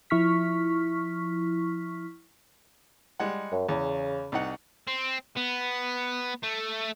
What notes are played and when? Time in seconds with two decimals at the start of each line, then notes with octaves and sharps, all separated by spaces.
0.10 F3 E4 C#6 F6 B6
3.20 G3 G#3 F#5
3.52 F#2
3.69 E2 C#3
4.32 C2 D#4 F#5
4.88 C4
5.36 B3
6.44 A3